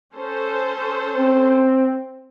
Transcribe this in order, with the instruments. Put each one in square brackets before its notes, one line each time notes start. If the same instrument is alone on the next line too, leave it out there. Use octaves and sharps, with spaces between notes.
[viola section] C#4 A4 C5
[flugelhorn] C4